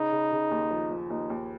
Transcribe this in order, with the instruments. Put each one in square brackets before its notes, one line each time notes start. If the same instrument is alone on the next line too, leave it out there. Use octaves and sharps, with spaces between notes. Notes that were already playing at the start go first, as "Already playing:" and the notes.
Already playing: [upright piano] C#3 [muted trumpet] D#4
[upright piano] C#3
C#3
D#2
F3
F3
[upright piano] D#2 [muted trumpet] D#4
[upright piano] D#2